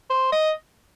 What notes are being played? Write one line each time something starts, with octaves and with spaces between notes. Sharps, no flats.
C5
D#5